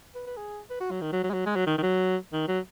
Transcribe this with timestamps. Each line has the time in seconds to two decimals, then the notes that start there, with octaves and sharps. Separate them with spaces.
0.15 B4
0.26 B4
0.37 G#4
0.70 B4
0.80 F#4
0.91 F#3
1.01 D#3
1.12 F#3
1.24 F#3
1.30 G#3
1.34 F#3
1.46 G#3
1.56 F#3
1.66 D#3
1.78 D#3
1.82 F#3
2.32 D#3
2.48 F#3